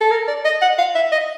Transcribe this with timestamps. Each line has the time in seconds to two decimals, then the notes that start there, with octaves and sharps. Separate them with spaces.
0.01 A4
0.11 A#4
0.28 D5
0.45 D#5
0.62 F#5
0.78 F5
0.95 E5
1.12 D#5